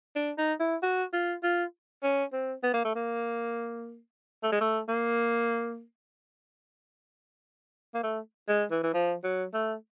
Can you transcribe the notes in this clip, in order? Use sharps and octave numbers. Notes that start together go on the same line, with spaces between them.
D4
D#4
E4
F#4
F4
F4
C#4
C4
B3
A#3
A3
A#3
A3
G#3
A3
A#3
A#3
A3
G#3
E3
E3
F3
F#3
A3